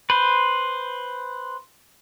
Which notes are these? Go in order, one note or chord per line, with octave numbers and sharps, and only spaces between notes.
B4 C5